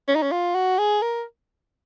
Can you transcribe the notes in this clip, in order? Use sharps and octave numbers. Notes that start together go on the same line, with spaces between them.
C#4
D#4
C#4
F4
F#4
G#4
A#4